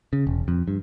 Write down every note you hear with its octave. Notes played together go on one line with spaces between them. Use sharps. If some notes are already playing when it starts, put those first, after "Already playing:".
C#3
E1
F2
G2